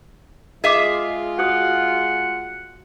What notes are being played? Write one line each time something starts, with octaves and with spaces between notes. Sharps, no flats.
G#3 F4 G#4 D#5 E5 D6
F#4 F#5 D#6